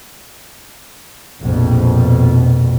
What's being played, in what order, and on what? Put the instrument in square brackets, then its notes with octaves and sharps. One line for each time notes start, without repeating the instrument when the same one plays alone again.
[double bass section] A#1 F2 B2